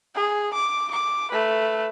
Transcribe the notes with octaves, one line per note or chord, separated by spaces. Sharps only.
G#4
D6
D6
A3 B4